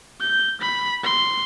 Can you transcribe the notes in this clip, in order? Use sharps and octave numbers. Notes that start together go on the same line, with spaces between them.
G6
B5
C6